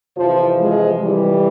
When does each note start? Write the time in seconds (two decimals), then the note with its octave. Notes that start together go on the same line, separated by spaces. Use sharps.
0.17 F2 C3 E3 F3
0.60 F3 G#3
1.02 E3 G3